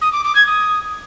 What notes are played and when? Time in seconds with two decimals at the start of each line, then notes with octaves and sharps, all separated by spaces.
0.01 D#6
0.12 D6
0.24 D6
0.35 G#6
0.46 D#6